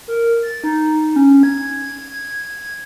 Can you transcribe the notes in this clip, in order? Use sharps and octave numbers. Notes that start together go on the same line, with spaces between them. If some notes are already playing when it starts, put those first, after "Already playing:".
A#4
A6
D#4
C#4
G#6
G#6